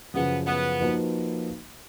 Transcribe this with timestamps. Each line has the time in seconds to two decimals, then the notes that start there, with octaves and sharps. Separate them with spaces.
0.14 F#2 C#3 F3 B3
0.47 B3
0.80 F3 A#3 D#4 F#4 B4